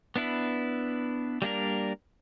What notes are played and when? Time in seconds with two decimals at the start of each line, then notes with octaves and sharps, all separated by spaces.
0.16 B3 D4 E4 B4
1.42 G3 A#3 D4 A#4